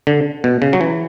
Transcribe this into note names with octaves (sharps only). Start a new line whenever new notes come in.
D3
B2
C#3
F#3
E3